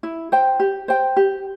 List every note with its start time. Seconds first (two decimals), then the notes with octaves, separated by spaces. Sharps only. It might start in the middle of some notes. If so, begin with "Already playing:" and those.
0.03 E4
0.32 C5 G5
0.60 G4
0.88 C5 G5
1.16 G4